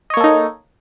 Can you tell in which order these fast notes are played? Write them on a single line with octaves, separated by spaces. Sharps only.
D#5 C#5 A#3 A4 D#4